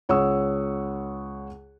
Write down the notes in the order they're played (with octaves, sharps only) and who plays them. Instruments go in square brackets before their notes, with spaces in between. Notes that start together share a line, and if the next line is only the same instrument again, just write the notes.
[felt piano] C#2 C#5 F#5 C#6 D#6 E6